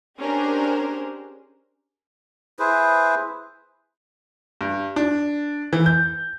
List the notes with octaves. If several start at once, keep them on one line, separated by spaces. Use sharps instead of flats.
C#4 D4 G4 G#4 A#4 C5
E4 G#4 B4 C5
G2
D4
E3
G6